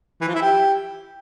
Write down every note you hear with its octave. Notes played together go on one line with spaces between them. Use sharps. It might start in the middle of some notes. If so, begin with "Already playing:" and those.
E3
F3
E4
G4